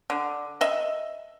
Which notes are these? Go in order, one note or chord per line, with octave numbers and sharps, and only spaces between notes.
D3
D#5 E5